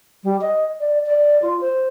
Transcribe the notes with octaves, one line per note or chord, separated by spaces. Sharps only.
G3
D#5
D5
D5
F4
C5